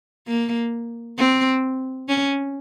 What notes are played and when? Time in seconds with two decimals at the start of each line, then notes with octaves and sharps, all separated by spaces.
0.27 A#3
1.18 C4
2.08 C#4